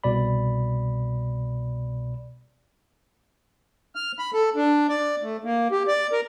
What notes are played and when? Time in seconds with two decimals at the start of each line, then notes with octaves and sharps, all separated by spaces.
0.04 C2 B2 D5 B5
3.95 F6
4.19 B5
4.34 A4
4.56 D4
4.89 D5
5.22 A3
5.44 A#3
5.71 G4
5.88 D5
6.12 A#4